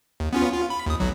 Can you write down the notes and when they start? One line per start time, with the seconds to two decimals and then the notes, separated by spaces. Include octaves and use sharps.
0.20 D#2
0.33 B3 C#4 F4
0.52 F4
0.70 B5
0.86 D#2 D#6
1.00 B1 F#3